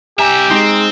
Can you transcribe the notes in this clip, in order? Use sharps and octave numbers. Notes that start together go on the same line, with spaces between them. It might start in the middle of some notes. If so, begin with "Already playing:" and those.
C2 G4 E5 G#5 A#5
G#3 C4 D#4